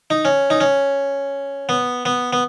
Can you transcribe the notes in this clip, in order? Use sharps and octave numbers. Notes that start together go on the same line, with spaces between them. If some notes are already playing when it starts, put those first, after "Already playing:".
D#4
C#4
D#4
C#4
B3
B3
B3